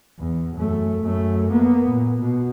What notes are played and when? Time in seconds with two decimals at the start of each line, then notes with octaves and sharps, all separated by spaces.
0.19 E2
0.56 F#2 A3
1.01 F#2 A3
1.51 A#3 B3
1.90 A#2
2.21 B2